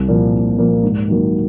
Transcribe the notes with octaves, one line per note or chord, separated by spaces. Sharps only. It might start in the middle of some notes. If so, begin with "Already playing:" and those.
Already playing: C2
A#2 F3 A#3
C2
A#2 F3 A#3
G#2
D#3 F#3 A#3